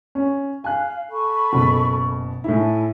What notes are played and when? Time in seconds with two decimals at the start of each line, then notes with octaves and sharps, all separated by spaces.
0.15 C#4
0.64 F5 G#5 F#6
1.10 A4 B5 C#6
1.53 F#1 B2
2.44 A2 E4 A4 G#5